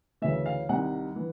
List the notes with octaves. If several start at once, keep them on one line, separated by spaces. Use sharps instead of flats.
D2 C#3 E3 E5
F5
C2 C3 D#3 F#5
E3